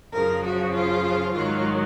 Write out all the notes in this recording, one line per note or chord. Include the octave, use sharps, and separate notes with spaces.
F#2 C#3 F3 A#4
F#4
F4
G#2 D#3 F#3 F4